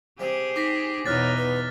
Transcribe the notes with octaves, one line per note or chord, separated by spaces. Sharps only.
C3 G3 C4 G4 G#4
D#4 D6 A#6 B6
E2 B2 D#4 C#5 F6 F#6 A6
B4